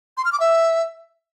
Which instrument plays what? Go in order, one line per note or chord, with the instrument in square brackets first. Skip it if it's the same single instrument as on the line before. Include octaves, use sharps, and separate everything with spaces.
[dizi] C6
F6
D6
E5